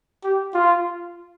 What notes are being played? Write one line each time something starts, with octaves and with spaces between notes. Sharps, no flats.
G4
F4